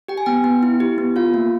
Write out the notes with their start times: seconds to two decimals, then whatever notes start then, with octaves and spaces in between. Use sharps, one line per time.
0.08 G4 G5
0.18 G#5
0.26 B3 G5
0.44 B3
0.63 E4
0.80 G4
0.98 B3
1.16 F4 F5
1.34 A#3